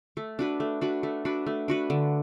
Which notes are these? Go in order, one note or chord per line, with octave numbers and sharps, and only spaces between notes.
A3
D4 F#4 B4
A3
D4 F#4 B4
A3
D4 F#4 B4
A3
D4 F#4 B4
D3